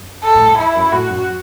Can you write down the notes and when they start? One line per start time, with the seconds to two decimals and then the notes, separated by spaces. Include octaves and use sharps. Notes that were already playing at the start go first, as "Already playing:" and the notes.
Already playing: F#2
0.24 A4
0.35 A2
0.46 F#2
0.58 E2 E4
0.75 F#2
0.92 A2 F#4
1.09 F#2